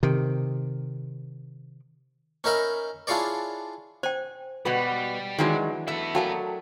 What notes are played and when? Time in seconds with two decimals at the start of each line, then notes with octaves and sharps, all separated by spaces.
0.03 C3 D#3
2.44 C#4 D#4 A#4 E5 B5
3.07 D4 E4 F4 G#4 C#5 D5
4.03 C5 G5 G#5
4.65 B2 G3 F#4 B4
5.39 D#3 E3 F#3 G#3 D4
5.88 A3 B3 E4 E5
6.15 F#3 A#4 D5 F5 G5 A5